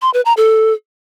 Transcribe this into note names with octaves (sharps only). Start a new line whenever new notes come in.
C6
B4
A#5
A4